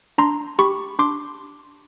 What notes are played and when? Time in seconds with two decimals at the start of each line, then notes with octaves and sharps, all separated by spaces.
0.18 D4 A#5 C6
0.59 G4 B5 C#6
0.99 D4 C6 D6